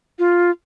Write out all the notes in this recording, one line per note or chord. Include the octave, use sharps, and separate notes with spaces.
F4